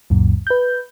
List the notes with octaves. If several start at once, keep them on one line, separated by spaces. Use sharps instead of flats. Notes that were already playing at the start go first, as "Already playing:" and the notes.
C#2 F#2 A#2
B4 G6